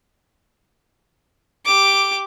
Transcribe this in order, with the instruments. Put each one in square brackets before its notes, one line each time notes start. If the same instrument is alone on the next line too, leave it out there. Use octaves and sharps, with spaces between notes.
[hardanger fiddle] G4 D6